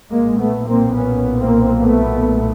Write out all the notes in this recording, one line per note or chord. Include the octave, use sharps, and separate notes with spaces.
B1 A#2 G#3 A#3
A3 B3
A#3 C4
B3 C#4
A#3 C4
A3 B3